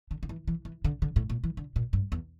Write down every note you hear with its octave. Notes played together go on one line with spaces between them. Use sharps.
D3
D3
E3
E3
E3
D3
D3
A2
A#2
E3
D3
A#2
G2
E2